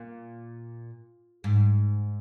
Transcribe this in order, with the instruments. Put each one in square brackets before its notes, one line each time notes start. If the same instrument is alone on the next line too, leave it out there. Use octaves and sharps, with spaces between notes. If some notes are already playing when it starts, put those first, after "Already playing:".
Already playing: [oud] A#2
G#2